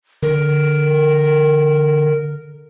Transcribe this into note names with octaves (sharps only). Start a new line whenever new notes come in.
D3 A#4